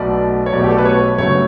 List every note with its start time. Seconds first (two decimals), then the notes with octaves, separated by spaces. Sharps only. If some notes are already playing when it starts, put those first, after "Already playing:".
Already playing: B1 B2 A3 D5
0.46 C#5
0.53 B1 B2 A3 D5
0.64 G4
0.71 A4
0.78 B4
0.85 C#5
1.18 G1 F#2 C#3 F#3 A3 C#5